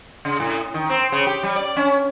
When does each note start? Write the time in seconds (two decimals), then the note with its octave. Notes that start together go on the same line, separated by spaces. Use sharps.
0.25 C#3
0.40 A2
0.74 D#3
0.89 C4
1.12 C#3
1.27 G4
1.43 G3
1.56 D5
1.76 C#4